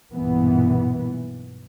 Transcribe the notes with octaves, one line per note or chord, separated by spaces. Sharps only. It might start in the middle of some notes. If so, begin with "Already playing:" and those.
B1 G2 A#2 E3 B3